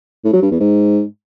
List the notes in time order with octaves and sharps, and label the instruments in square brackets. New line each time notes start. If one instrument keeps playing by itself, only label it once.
[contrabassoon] A2
F#3
G2
E2
G#2